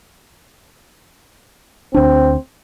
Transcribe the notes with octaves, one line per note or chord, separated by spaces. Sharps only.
D2 C4 D4